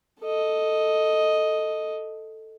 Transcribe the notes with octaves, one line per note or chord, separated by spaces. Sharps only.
A4 D#5